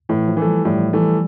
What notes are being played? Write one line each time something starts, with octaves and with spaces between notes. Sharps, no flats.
A2 E3
F3
E3 A3
G3
A2 G3
E3 A3